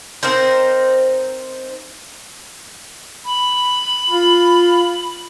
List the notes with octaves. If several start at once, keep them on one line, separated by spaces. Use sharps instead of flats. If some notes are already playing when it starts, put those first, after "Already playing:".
C4 D#4 A#4 C5
B5
F4